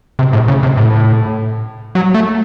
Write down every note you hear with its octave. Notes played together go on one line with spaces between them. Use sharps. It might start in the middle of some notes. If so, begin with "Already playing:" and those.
C3
A2
C#3
C3
A2
F#3
A3